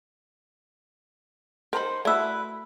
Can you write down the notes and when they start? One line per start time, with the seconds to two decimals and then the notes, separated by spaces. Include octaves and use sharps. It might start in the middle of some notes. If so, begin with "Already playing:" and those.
1.73 D#4 A#4 C5 A#5 B5
2.05 A3 E4 F#4 A4 B4 D5 E6